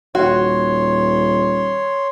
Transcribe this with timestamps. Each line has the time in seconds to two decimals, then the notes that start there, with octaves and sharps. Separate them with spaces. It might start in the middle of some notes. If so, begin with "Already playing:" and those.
0.15 D#1 F#4 C#5 C6